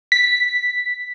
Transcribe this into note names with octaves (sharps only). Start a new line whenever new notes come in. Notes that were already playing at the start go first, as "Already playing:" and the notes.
B6